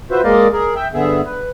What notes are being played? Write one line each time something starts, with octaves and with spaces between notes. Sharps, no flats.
F4 F#4 B4 C5 E5
G#3 A#3 A#4 D5 D#5 F5
G#4 A#4
E5 G5
G2 D3 B3 G#4 E5
B4